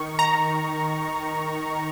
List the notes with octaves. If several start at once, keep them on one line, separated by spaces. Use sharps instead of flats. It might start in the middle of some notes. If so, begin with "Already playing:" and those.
Already playing: D#3 C#6
A#5